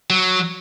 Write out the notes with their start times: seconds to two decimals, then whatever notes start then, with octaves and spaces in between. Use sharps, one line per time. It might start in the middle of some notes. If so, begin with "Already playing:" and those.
0.10 F#3